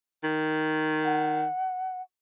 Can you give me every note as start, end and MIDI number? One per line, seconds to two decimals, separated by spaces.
0.24 1.45 51
1.05 2.02 78